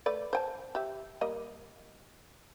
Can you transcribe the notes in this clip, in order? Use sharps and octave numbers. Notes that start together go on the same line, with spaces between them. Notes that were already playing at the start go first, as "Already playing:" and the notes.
A3 B4 D5
C5 G5 A5
G4 E5
G3 A#3 D#5